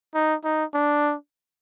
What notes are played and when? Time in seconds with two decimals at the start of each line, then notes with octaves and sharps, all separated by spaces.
0.14 D#4
0.44 D#4
0.74 D4